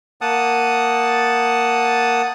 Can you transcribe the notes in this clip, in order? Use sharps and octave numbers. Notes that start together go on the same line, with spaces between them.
A#3 F#5 A5 D#6